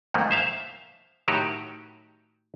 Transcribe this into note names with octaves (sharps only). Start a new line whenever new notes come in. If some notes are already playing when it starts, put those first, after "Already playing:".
F2 G#2 D#3 F3 A3 A#3
C5 E5 F5
A2 D#3 F#3 D#4 F#4 G4